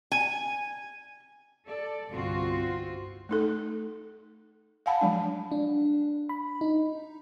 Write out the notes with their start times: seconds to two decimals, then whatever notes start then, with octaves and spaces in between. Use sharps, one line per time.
0.12 G#5
1.66 A4 D5
2.10 G1 C2 C4 F4 F#4
3.29 A3 D#4 A4
4.86 F5 F#5 G#5 A5 B5
5.01 F3 F#3 G#3 D4
5.52 D4
6.29 B5
6.61 D#4